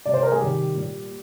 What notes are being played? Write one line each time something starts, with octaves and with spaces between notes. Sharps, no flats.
C3 G3 D5
C5
A#4
G#4
C3 D#3 G3 G4
A#2 G3